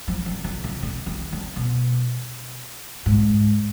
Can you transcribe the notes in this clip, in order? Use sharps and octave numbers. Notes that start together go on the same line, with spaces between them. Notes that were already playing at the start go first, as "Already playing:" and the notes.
F3
D#3
D3
D3
D3
D#3
D3
B2
G#2